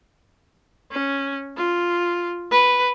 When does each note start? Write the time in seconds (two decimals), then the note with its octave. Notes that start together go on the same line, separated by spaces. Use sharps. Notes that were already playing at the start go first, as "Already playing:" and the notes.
0.91 C#4
1.57 F4
2.51 B4